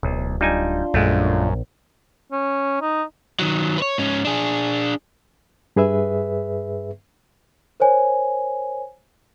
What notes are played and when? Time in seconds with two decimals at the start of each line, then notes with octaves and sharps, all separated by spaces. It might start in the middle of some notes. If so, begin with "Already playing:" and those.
0.03 D1 B1
0.41 G3 D4 D#4 F4 G#5
0.94 A#1 F#2 G#3 A3
2.32 C#4
2.81 D#4
3.39 D#3 F#3
3.78 B4 C#5
3.98 G#2 C#4
4.25 D4 G#4
5.76 G2 G#4 B4 E5
7.80 A#4 C5 C#5 G#5